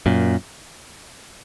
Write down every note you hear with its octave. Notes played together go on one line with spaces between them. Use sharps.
F#2 A#2